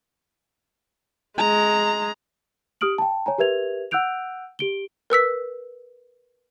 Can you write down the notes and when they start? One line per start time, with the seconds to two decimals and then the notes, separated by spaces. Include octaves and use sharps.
1.38 G#3 A#5
2.81 G4 D#6 F6 D7 F#7
2.98 G5 A5
3.26 C#5 G#5 A#5
3.38 G4 A#4 B4 E5 G#6 F7
3.91 F#5 E6 F#6 G6 D7 F7
4.59 G4 D7 G7
5.10 A#4 B4 E6 B6